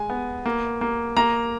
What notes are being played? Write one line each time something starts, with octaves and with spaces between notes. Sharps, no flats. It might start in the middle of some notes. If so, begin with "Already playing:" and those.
Already playing: G#3 G#5
B3
A#3
A#3
A#3 A#5